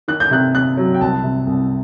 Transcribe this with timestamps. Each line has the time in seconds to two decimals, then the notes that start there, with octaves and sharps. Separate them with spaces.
0.08 D#3 F#6
0.20 G6
0.31 C3 F#6
0.55 C3 F#6
0.77 F#3
0.94 G5
1.01 C2 A5
1.24 C3
1.47 C2